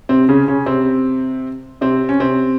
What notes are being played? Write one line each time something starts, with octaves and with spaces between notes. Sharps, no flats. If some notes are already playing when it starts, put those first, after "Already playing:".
C3 C4
C#3 C#4
C#3 C#4
C3 C4
C3 C4
C#4
C3 C4